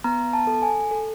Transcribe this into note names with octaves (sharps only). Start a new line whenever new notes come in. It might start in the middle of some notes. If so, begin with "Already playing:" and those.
B3 A#5
A5
A4
G#5
A4